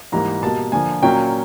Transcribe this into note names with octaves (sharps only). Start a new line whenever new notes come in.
G#2 E3 G3 A#3 A#5
B2 G3 A#3 A5
D3 F3 A#3 G#5
A#2 F#3 A#3 C#4 G5